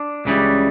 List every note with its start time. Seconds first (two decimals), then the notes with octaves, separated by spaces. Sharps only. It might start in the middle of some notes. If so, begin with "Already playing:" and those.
Already playing: D4
0.25 C#2 C#3 E3 G3